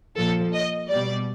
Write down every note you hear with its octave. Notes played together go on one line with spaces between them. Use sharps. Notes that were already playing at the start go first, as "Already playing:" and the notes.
A#2 F3 A4
D#5
B2 G3 D5